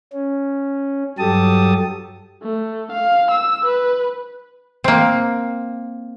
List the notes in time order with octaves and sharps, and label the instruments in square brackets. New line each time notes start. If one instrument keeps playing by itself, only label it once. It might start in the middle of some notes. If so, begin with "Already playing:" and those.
[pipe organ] C#4
G2 F#3 G4 A4 A5 D#6
[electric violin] A3
F5
E6
B4
[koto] A#3 C4